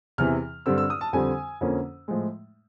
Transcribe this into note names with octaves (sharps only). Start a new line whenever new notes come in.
E2 C3 E3 F6
G2 D3 G3 C4 E6
E6
D#6
A5
F2 D3 G3 C4 G#5
F2 D3 F3 A#3 C#4
A2 F3 G#3